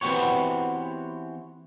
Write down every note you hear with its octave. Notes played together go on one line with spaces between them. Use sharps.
E3 B3 C4 F#4 G4 C#5